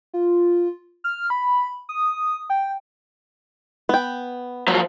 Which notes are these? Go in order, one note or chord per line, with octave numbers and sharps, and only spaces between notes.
F4
F6
B5
D#6
G5
B3 G5
F3 F#3 A#3